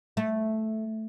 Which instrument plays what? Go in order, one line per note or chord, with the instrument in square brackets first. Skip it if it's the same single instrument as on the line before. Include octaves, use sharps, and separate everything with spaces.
[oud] A3